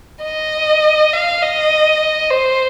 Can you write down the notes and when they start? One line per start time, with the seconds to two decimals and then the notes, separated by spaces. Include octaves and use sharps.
0.23 D#5
1.13 F5
1.42 D#5
2.31 C5